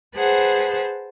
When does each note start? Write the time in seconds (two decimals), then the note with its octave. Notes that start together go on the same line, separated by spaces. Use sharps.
0.16 G#4 B4 C5 F#5 A5